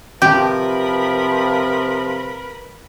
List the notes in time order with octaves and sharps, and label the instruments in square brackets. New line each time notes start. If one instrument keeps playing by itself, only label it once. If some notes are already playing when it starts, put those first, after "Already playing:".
[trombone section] C3 F3 [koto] G4 [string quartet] A#4 B4 B5